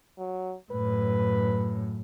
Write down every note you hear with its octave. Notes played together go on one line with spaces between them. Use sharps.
F#3
F#2 A2 B4